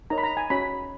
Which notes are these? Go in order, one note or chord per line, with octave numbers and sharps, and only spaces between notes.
D#4 A#4 C#5 A#5
B5
A#5
G#5
C#4 F#4 C#5 B5